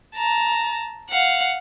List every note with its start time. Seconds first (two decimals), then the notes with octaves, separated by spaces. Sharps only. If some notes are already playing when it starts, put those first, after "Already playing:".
0.15 A5 A#5
1.09 F5 F#5